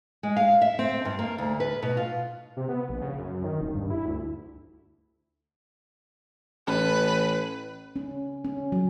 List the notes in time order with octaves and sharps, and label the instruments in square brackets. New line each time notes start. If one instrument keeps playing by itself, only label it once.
[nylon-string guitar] G#3
F5
E5
C4
G2
A#3
D2
B4
B2
F4
[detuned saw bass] C3
B3
A#1
C#3
F#2
D#3
D#1
G2
E4
D2
[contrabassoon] A1 [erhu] B4
[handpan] C#4
C#4
F#3